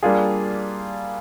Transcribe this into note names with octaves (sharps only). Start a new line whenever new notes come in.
G3 A#3 D4 F4 G#4